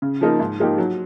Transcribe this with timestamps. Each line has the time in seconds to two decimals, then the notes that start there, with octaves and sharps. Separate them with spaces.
0.02 C#3
0.21 F3 A#3 D#4
0.40 G#2
0.60 F3 A#3 D#4 G4
0.78 F#3